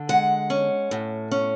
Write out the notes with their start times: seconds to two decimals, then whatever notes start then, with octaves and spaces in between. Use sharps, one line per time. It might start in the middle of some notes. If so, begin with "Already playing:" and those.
Already playing: D3
0.09 G#3 F#5
0.50 C#4
0.91 A2
1.31 C#4